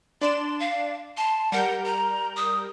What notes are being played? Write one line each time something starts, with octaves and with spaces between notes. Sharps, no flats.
D4 D5 C6 E7
F5
A5 C6
G3 A#4 F#5 G6
A#5
D#6